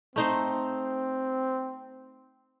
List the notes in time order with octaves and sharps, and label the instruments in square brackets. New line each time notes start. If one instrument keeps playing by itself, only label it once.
[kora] A3 D#4 C5 [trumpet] C4